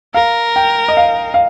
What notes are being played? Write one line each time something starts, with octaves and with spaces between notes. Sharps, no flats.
A#4 F5
G5
D#5
F5
F5